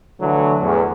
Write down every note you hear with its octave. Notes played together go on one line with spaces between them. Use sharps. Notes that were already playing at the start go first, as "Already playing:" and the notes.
D3 E3 F#3 A3
E2 A2